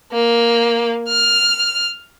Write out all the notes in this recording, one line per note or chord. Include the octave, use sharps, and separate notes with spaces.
A#3
F6